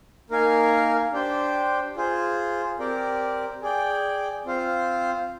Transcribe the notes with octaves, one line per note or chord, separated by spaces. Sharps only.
A#3 D#4 A#4 F5 G#5
D4 G4 C5 G5
F4 G#4 C5
C4 G4 A#4 D5
G#4 D5 G5
C4 F4 C5 F5